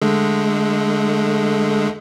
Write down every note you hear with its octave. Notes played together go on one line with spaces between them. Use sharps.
D3 G#3 A3